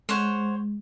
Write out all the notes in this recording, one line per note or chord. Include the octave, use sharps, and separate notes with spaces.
G#3 C5 C#5 F#5